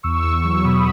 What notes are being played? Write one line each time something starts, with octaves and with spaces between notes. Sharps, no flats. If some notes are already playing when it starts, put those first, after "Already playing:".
E2 C#6 E6
E2
C#6 E6
F#3
B2 B5 D#6